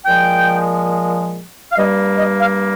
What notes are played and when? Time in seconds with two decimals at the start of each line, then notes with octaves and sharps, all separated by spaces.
0.05 A#2 F3 G#3 G5
1.72 F5
1.77 G2 G3 A#3 D#5
2.19 D#5
2.41 F5